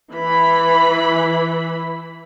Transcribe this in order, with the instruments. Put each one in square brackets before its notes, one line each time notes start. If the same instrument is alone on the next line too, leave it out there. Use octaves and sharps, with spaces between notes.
[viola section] E3 B5